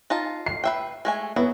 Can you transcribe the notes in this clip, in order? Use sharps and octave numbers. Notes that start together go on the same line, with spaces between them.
D#4 F4 A5
C7
B4 E5 G5
G#3 A3 G#5
F#3 B3 E4